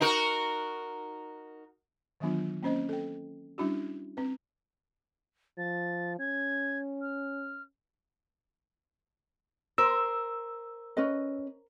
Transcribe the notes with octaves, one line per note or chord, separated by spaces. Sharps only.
D#4 F#4 A#4
D#3 E3 F#3 B3 D4 F4
A#3 C4 C#4 C5 D#5
A4 G5
G3 C#4 D4 E4 F#4
C4 B4
F3 A6
C#4 G#6
F6
A#4 C5 E6
C#4 B4 D#5